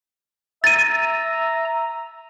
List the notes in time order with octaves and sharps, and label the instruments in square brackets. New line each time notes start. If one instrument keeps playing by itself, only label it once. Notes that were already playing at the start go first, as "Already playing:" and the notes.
[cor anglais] E5 [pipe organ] A#5 [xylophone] A6 D#7